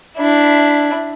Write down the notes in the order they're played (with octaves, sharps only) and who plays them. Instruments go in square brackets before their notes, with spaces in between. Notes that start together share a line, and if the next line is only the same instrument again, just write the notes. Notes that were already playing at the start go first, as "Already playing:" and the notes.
[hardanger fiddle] D4 E4